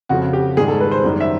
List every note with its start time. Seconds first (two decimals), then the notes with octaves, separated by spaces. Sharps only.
0.09 F2 C#3 F3 F#4
0.33 G4
0.57 G#2 D#3 G3 G#4
0.68 A4
0.80 B4
0.91 C5
1.04 F#2 D#3 G3
1.20 E5